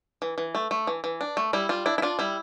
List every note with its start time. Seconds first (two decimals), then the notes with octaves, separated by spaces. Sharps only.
0.22 E3
0.38 E3
0.55 A3
0.71 A3
0.87 E3
1.04 E3
1.21 D4
1.37 A3
1.53 G3 E4
1.69 G3 F4
1.86 D4 E4
1.98 E4
2.02 D4 F4
2.19 G3 E4